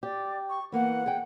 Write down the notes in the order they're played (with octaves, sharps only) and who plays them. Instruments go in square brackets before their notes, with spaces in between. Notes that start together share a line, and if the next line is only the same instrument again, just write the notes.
[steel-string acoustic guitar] G4 [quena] D5
[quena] C#6
[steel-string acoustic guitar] E3 A#3 B3 [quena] F#5
[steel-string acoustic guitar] G#4 G5